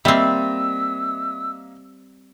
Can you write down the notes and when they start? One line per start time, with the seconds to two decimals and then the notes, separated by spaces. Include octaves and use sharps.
0.05 G3 A#3 C4 D#5 E5 E6